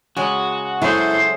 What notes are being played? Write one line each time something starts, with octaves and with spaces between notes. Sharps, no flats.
C#3 G#3 F#4
F#3 G#3 E4 A4 C5